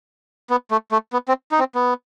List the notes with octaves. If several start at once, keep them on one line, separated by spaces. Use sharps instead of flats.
B3
A3
A3
B3
C4
D#4
C4
B3